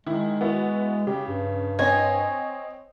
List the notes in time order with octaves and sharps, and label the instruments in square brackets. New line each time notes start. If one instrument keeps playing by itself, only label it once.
[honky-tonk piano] D#3 E4 [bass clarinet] G#3
[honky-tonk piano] B3 E4 F#4
[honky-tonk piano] C#3 [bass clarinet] G4
[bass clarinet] G2
[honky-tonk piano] C4 C#5 D#5 [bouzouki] G#5